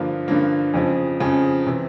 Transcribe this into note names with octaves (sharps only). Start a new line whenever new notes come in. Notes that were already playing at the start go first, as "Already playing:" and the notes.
Already playing: G2 D3 F3 A#3
G2 D3 F3 A#3
F2 C#3 F3
F2 C#3 F3
C3 E3